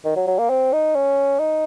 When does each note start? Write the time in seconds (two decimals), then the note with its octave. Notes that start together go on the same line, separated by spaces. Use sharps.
0.05 D#3
0.16 F#3
0.27 F#3
0.39 A#3
0.50 C4
0.72 D#4
0.95 C#4
1.39 D#4